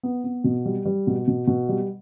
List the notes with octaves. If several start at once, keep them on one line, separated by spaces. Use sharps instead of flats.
B3
B3
B2
G3
G3
B2
B2
B2
G3